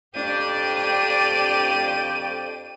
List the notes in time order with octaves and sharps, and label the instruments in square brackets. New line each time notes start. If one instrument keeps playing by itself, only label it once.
[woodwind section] F2 G5 [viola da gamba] D4 G4 D5 [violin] D#7